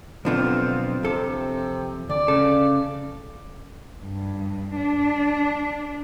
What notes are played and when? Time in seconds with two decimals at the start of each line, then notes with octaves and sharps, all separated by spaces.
0.25 B1 D3 F3 B3 C4 F4
1.03 F2 C3 A4 A5
2.10 D2 D5
2.28 C#3 A4
4.03 G2
4.76 D4